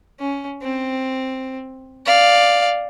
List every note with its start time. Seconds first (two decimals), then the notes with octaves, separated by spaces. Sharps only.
0.20 C#4
0.62 C4
2.06 D5 F5